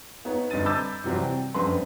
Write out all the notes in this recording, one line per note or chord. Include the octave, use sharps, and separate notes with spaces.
B3 D#4 B4 C#5
G1 G2 C4 D#5 A6 D#7
A#5 B5 D6 E6 G6 A6
C3 E3 F#3 G3 C4
G5
F1 F#2 C4 D4 B4 C6